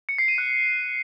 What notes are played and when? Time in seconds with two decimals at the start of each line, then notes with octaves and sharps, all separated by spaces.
0.09 C#7
0.18 C7
0.28 D#7
0.38 F#6